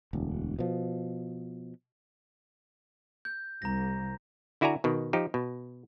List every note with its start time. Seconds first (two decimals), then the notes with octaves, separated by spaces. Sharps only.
0.13 E1 D2
0.59 B2 F3
3.25 G6
3.62 C2 A#5 A#6
4.61 D3 E4 F#4 D5 G#5 A#5
4.84 B2 D#3
5.13 F3 D#4 G4
5.34 B2